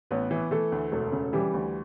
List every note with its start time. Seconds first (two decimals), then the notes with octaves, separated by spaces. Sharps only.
0.11 A1 B3 B4
0.31 E3
0.51 E3 A3 A4
0.72 D2
0.92 E1 A3 A4
1.12 C#3
1.33 E3 G3 G4
1.53 D2